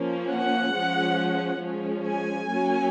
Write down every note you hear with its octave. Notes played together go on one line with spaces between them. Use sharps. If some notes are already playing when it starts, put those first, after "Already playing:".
Already playing: F3 A#3 C#4
F#5
F3 G#3 C#4
F3 G#3 C#4
G#5
F#3 A#3 C#4